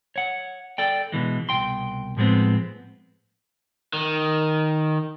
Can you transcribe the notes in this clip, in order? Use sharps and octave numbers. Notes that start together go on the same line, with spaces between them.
C#5 F#5
A4 D5 G5
B2 E3 G#3
C2 B2 G5 C6
A2 F3 G#3 B3 C4
D#3